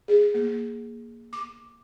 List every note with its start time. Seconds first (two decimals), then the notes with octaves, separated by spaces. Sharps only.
0.08 G#4
0.34 A#3
1.33 D6